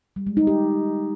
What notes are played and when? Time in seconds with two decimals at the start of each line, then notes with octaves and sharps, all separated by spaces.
0.16 G3
0.27 G#3
0.37 D#4
0.47 G4